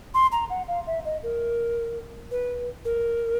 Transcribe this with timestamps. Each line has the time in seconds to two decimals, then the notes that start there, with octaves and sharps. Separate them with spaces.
0.14 C6
0.32 A#5
0.50 F#5
0.68 F5
0.87 E5
1.05 D#5
1.23 A#4
2.31 B4
2.85 A#4